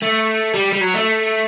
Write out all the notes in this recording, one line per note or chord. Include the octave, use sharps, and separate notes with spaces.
A3
G3
G3
F#3
A3